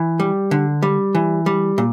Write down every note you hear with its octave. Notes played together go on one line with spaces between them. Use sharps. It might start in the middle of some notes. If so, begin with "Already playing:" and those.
Already playing: E3
G3
D3
G3
E3
G3
A#2